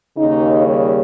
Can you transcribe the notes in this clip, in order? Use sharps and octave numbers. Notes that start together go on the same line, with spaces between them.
D#2 C#3 D#4
G3